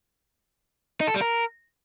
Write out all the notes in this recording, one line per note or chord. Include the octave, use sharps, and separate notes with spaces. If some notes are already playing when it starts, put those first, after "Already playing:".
D#4
A4
G3
A#4